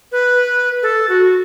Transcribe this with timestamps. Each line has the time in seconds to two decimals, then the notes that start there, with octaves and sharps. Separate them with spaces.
0.12 B4
0.83 A4
1.09 F#4